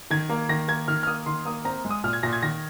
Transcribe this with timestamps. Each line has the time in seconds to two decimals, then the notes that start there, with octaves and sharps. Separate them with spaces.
0.10 D#3 G#6
0.29 A#3
0.49 D#3 A#6
0.68 A#3 G#6
0.88 D#3 F6
1.03 F6
1.07 A#3 D#6
1.26 D#3 C6
1.45 A#3 D#6
1.65 C4 A#5
1.85 G#3
1.91 D#6
2.04 A#2 F6
2.13 G#6
2.23 A#2 A#6
2.33 G#6
2.42 D#3 A#6